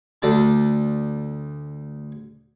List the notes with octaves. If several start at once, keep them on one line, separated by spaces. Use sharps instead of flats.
D2 D4 A5